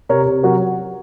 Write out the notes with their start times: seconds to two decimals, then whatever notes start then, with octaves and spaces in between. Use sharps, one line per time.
0.09 C3 A#4 C#5
0.26 C3
0.43 F#3 F#4 A#4